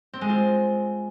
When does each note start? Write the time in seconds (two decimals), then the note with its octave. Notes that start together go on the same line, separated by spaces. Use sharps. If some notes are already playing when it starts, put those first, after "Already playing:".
0.13 C4
0.21 G#3
0.29 F4